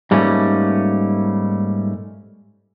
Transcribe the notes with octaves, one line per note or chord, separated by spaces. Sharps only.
G#2 G3 A3 A#3 C#4